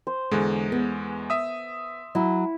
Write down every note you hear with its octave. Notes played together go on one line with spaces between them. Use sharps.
C5
E2 D3 G#3
B3
E5 D#6
F#3 E4